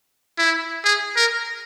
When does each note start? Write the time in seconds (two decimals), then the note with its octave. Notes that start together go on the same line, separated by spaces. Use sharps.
0.38 E4
0.84 G#4
1.16 A#4